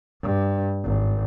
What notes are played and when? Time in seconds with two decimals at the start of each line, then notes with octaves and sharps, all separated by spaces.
0.22 G2
0.84 G#1